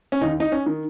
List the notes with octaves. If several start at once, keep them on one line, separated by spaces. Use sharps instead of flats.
C#4
D#2 D#4
D#4
C#4
D#3